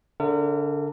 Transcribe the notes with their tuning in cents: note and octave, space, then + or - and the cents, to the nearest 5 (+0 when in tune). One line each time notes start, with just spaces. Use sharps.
D3 -20 A#4 -40 E5 +5